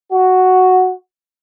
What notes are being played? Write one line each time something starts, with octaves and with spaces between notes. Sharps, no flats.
F#4